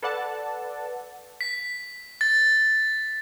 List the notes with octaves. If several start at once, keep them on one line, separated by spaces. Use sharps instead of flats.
A4 B4 D5 F#5 A5
B6
A6